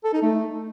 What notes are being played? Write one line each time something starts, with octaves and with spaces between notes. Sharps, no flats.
A4
D#4
A3